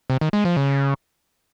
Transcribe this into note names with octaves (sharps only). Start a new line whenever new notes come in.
C3
D#3
G#3
F3
C#3